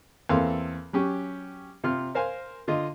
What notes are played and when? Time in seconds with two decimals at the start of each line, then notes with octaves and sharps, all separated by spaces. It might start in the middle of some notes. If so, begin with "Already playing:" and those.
0.29 E2 A#3 C4 A4 F5 C6
0.93 F#3 C#4 G4
1.84 C3 F4 F6
2.15 A#4 C5 F5 G#5 C6
2.68 D3 F4 D#5